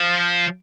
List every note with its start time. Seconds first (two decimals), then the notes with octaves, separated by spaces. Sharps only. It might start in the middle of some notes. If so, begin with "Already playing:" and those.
Already playing: F3